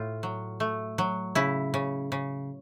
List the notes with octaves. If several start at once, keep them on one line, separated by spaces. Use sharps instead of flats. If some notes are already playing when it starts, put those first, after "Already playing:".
Already playing: A2 F4
F#3
A3
F#3
C#3 E4
C#3
C#3